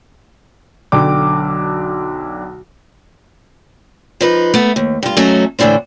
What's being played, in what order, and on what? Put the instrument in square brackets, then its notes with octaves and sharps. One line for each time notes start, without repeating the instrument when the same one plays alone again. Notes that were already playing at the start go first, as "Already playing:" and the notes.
[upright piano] B1 D3 G5 D6
[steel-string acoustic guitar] F3 D#4 B4
A3 B3
D#2
G2 F4
F#3 A3 C#4 D#4 A4
A2 D3 E3 D4 C5